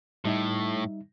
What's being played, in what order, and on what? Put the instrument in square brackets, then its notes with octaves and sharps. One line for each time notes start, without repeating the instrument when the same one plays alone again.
[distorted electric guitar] A2 [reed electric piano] G3 D#4 E5